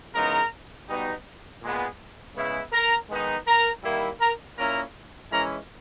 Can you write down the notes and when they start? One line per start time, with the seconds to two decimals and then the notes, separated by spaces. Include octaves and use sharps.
0.13 C#3 E3 G#3 B3 D#4 A#4 A#5
0.87 B2 G3 B3 D#4
1.62 A#2 G#3 B3
2.35 C#3 G#3 B3 E4
2.72 A#4 A#5
3.10 D#3 G#3 B3 D#4
3.47 A#4 A#5
3.83 D#3 G3 A#3 E4
4.20 A#4 A#5
4.57 A#2 A#3 C#4 E4 A#4 A#5
5.31 E3 G#3 C#4 E4 A#4 A#5